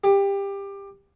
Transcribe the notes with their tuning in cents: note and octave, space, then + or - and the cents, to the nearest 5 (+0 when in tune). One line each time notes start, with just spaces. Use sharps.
G4 +20